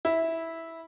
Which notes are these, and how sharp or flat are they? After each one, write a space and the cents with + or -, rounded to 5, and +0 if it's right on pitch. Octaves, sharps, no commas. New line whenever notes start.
E4 -10